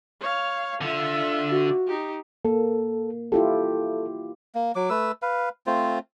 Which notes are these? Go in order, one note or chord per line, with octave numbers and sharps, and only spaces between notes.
C#5 F5
D3 F4 E5
F#4
D#4 G4
A#3 A4
E4 F4 G4 A4
A#3
F#3 D6
A3 B4 E6
B4 F5
A3 C4 F4 C5